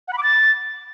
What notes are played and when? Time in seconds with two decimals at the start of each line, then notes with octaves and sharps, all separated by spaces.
0.08 F#5
0.13 B5
0.18 D6
0.23 A6